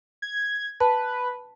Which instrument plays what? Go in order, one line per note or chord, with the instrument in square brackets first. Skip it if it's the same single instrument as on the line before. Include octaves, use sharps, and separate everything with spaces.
[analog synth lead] G#6
[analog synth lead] B4 [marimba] A5